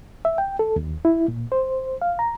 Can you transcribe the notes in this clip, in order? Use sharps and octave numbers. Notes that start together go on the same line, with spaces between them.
E5
G5
A4
D#2
E4
A#2
C5
F5
A#5